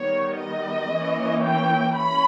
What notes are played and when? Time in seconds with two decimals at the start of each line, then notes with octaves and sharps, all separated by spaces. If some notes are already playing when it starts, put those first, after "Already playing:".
Already playing: D#3 G3 B3 C#5
0.38 D#5
0.90 E3 A#3 C#4
1.43 G5
1.96 C#4 B5